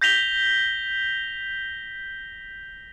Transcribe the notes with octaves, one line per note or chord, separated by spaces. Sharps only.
G6 A#6 B6 F7 G7